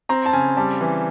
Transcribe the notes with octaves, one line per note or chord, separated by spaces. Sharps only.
C4 A#5
A5
C#3 G#5
G3 A5
E3